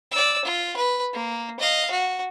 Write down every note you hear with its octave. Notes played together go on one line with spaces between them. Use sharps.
D5 E6
F4
B4
A#3
D#5 F5
F#4